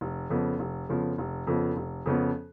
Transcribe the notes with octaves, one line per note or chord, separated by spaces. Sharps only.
F1
F2 C#3 F3 B3
F1
F2 C#3 F3 B3
F1
F2 C#3 F3 B3
F1
F2 C#3 F3 B3